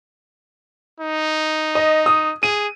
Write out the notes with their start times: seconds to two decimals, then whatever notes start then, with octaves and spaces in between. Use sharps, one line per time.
1.00 D#4
1.75 D#5
2.06 D#6
2.43 G#4 D#7